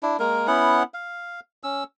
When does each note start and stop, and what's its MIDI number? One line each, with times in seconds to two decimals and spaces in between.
0.03 0.17 62
0.03 0.17 64
0.20 0.47 56
0.20 0.47 58
0.20 0.47 70
0.47 0.83 59
0.47 0.83 61
0.47 0.83 64
0.47 0.83 78
0.94 1.40 77
1.64 1.84 61
1.64 1.84 88